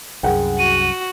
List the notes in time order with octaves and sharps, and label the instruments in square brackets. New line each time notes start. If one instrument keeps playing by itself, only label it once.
[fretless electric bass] C2 F#2 [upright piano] G#4 F#5 G5
[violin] F#4 [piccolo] D#7